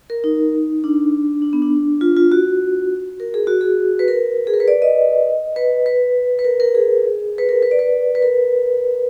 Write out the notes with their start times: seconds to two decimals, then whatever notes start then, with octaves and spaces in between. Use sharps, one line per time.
0.10 A#4
0.24 D#4
0.84 D4
1.42 D4
1.53 B3
1.62 D4
2.01 F4
2.17 F4
2.32 F#4
3.20 A#4
3.34 G#4
3.47 F#4
3.61 G#4
3.99 B4
4.08 A#4
4.47 G#4
4.54 A#4
4.60 B4
4.68 D5
4.82 D#5
5.56 B4
5.86 B4
6.39 B4
6.44 A#4
6.60 A#4
6.75 G#4
7.38 B4
7.49 A#4
7.63 B4
7.71 D5
7.79 B4
8.15 B4
8.22 A#4